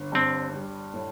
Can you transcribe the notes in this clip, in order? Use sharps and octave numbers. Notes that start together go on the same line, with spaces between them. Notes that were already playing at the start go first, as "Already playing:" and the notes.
Already playing: G1
G2 C4
G3
A2